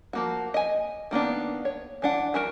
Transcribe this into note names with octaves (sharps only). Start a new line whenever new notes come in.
F3 A#3 F#4
D#5 G#5
D#3 A#3 B3 D4
C#5
E3 D4 F#5
E3 F#4 A#4